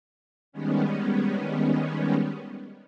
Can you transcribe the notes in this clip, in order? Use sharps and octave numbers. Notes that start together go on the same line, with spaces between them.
D#3 G3 G#3 B3 C#4